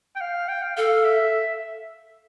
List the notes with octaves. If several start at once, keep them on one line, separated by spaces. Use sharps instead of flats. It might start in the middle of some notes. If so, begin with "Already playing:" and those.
G5
F5
G5
F5
A4 F5
E5